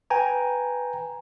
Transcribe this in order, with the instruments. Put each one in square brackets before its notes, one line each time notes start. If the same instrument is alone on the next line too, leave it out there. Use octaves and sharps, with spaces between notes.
[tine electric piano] B4 G5 G#5 A#5